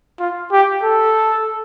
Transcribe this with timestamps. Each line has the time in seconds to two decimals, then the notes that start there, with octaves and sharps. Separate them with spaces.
0.20 F4
0.52 G4
0.83 A4